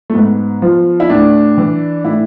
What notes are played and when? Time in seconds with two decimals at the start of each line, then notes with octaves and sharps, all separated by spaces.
0.10 A3
0.15 G#2 B3
0.62 F3
1.00 E4
1.10 A2 D4
1.58 E3
2.05 A2 E4